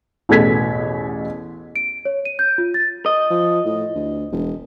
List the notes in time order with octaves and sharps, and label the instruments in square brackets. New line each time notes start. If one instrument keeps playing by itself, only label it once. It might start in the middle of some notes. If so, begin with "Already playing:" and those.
[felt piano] A1 E2 B2 A4 G#6 B6
[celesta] D7
C#5
D#7
G6
F4
A6
[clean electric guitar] D#5
[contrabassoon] F3
A2
D2
E1